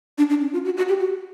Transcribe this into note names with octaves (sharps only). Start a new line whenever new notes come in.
D4
D4
C#4
F4
F#4
F#4
G4
F#4